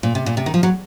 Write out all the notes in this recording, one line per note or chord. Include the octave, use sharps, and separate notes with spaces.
A#2
C3
A#2
C3
D#3
F3
F#3